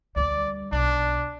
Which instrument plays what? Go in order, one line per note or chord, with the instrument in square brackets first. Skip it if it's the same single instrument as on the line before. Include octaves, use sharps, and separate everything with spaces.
[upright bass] D2 G3 [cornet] D5
[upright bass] B1 [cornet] D4